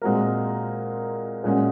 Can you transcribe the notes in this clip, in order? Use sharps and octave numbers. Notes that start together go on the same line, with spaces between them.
A#2 G#3 C4 F#4 A#4
A#2 G#3 C#4 F#4